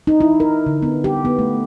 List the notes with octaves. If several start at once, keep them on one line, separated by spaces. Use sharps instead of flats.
D#4
E4
A#4
D3
B3
G4
B3
A3